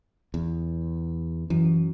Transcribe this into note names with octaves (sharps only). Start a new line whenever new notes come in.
E2
F#2 E3